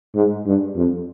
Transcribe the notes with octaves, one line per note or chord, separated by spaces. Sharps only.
G#2
G2
F2